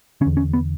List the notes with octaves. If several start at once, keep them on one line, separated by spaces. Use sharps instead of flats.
D3 C#4
E2
C#4
B3